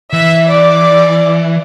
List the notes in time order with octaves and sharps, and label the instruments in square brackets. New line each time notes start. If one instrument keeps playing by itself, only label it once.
[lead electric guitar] E3 [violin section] E5
[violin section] D5